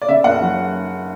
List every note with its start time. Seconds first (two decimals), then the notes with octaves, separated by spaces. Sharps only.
0.02 D5
0.08 C#3 E5
0.24 F#1 F#5
0.42 F#3